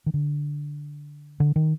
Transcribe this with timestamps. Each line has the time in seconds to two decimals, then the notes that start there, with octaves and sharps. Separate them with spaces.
0.06 D#3
0.14 D3
1.40 D3
1.56 D#3